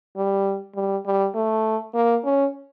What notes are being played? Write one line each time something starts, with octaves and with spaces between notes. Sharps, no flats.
G3
G3
G3
A3
A#3
C#4